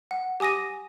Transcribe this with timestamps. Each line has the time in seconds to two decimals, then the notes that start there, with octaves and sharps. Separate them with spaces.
0.11 F#5
0.40 G4 G#5 D#6 A#6 D#7